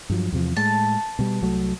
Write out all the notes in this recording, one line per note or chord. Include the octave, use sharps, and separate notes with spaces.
G2 F3 F#3
E2 C3 F3
A2 G#3 A5
B2 G3 B3
C2 F#3 A3